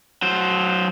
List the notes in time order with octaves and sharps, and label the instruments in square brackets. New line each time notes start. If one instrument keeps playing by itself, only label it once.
[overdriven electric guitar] F#3 C5